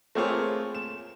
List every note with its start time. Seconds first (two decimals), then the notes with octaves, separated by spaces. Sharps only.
0.15 A3 A#3 C4 F4 G#4 C#5
0.75 E7